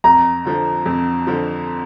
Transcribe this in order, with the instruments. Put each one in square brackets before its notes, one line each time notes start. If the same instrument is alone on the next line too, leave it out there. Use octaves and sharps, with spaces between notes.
[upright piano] F2 [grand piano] A#5
[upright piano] D3 F3
F2
D3 F3